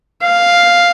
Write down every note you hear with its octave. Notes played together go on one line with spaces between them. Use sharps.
F5